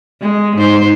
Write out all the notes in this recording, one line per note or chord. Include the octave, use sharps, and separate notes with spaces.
G#3
G#2 C5